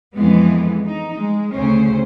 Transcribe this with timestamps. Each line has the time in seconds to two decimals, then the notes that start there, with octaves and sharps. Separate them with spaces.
0.16 F2 E3 G#3 B3
0.84 D#4
1.17 G#3
1.53 D2 C#3 C#4 C5